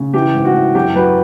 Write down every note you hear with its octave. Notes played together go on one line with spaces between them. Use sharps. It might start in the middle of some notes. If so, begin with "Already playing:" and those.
Already playing: C#3
E3 G4
G#2
F#4
E3
F#2 G4
F#3 B4